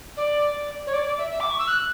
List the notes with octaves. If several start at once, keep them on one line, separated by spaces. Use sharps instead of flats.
D5
C#5
D5
D5
E5
E5
D6
C#6
E6
F#6